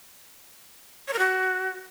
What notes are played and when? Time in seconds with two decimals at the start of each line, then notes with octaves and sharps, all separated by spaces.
1.08 C#5
1.13 A#4
1.19 F#4